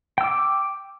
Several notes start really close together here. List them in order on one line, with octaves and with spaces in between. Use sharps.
G5 E6 D6